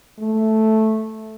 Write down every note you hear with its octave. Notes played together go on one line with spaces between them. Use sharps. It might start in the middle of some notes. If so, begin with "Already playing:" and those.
A3